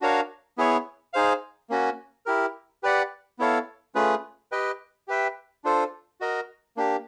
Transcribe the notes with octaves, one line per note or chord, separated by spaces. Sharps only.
D4 F#4 A#4 C#5 F5
B3 E4 G#4 C#5
D#4 G#4 C5 F5
A#3 C#4 F#4
E4 G4 A#4
G4 B4 D5 F#5
B3 E4 A4 C#5 F5
A3 C#4 F4 G#4 B4
G4 B4 D#5 G5
G4 B4 E5 G5
D4 F4 A4 C5
F#4 A#4 D#5
A#3 D4 G4